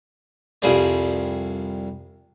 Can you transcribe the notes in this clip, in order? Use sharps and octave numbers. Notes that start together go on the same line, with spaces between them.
C2 F2 G3 G#4 C5 D5